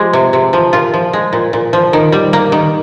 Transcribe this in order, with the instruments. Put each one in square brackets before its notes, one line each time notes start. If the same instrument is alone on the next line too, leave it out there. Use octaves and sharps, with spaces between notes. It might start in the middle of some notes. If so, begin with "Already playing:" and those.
Already playing: [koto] F3 G#3 G4
C3
C3
F3
A#2 F4
F3
G#3
A#2
A#2
F3
D#3
G3
A#3
D#3